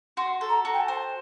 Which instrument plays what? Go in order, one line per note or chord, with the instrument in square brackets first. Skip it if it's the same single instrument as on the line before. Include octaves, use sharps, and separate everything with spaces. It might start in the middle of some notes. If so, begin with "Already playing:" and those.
[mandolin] F#4 [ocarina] C6
[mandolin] A4
[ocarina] A#5
[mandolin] F#4
[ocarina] G5
A5
[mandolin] C5